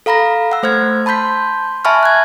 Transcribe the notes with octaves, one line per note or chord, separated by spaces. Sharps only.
A4 F5 A#5 B5 A#6
F#5 E6
A3 C5 F6 G#6
A5 B5 C6 G6 B6
E5 G#5 A5 B5 C#6 F6
F#6 G#6